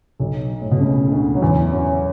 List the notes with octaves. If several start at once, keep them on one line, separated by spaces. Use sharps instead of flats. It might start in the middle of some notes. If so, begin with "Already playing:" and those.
B1 B2
A2
B2
C#2 C#3
C#3
D2 D3
F#3
E2 E3
F#2 F#3